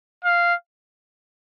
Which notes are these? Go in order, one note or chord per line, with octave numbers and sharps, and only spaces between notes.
F5